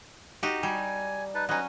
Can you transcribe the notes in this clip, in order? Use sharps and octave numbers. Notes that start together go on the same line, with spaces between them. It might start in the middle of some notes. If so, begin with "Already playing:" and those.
D#4 F#4 G4
G3 G#5
D#4 B4 A5
F#3 C#4 D#4 B4 D#5